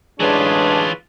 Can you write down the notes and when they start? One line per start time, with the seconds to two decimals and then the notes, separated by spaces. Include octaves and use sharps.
0.20 A1 E3 G#3 D4 F4 G#4 B4 C#5